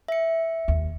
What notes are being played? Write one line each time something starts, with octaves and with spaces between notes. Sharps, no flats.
E5 C#7
D#2